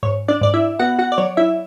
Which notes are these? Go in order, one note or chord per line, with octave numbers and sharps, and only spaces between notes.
G#2 C#5
D4 D5
G#2 D5
E4 E5
B3 F#4 F#5
F#4 F#5
D5
F#3 C#5
E4 E5